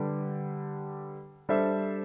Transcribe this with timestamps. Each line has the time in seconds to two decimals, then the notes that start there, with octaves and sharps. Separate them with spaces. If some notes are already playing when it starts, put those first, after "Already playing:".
Already playing: D3 G3 D4 G4 B4
1.49 G3 D4 A4 C5 E5